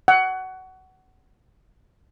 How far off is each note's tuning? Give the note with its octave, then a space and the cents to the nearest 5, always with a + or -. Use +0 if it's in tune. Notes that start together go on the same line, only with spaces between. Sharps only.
F#5 +20